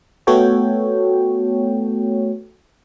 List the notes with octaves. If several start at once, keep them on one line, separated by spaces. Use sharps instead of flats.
A3 B3 F#4 A4 C#5 G5